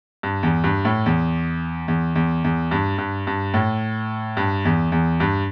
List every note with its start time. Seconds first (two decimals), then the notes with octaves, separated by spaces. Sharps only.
0.23 G2
0.43 E2
0.64 G2
0.85 A2
1.06 E2
1.88 E2
2.15 E2
2.44 E2
2.71 G2
2.98 G2
3.27 G2
3.54 A2
4.37 G2
4.65 E2
4.92 E2
5.20 G2